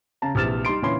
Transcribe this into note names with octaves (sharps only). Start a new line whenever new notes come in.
C#3 A5 A#5
A#1 C3 E3 F6 A6 E7
G3 D#4 C6 D7
A#2 D3 E3 C#4 B5 C6